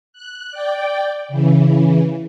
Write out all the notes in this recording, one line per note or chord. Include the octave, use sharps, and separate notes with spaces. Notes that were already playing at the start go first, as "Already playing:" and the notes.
F#6
D5 G5
C#3 E3